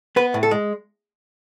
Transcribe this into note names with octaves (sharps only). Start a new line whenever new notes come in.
B3 B4
A2
A4
G#3